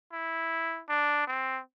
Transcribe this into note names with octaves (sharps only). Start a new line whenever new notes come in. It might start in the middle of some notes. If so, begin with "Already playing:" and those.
E4
D4
C4